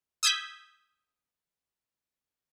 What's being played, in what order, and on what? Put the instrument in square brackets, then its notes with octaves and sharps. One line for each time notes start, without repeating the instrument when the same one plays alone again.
[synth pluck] D#6 E6 G6 G#6 B6